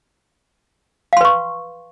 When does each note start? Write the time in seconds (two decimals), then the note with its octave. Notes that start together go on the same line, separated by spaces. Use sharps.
1.13 F5
1.17 C6
1.21 B4
1.25 C#6